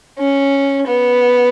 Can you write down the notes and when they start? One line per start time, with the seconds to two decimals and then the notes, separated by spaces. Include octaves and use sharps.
0.18 C#4
0.87 B3